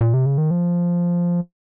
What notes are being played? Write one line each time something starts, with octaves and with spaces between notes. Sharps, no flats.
A#2
C3
C#3
D#3
F3